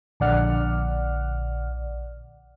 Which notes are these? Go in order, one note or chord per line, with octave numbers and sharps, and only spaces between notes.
A#1 D3 D5 F#5 F6